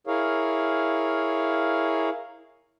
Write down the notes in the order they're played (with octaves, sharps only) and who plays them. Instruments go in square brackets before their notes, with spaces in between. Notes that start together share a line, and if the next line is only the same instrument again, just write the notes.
[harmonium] E4 G#4 A#4 C#5 F5